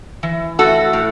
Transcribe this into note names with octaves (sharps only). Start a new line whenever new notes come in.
E3
A3 F#4 A4
A2